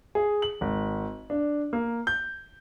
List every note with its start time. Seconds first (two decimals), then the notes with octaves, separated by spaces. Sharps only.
0.15 G#4
0.42 F#7
0.61 G#1
1.30 D4
1.73 A#3
2.07 G6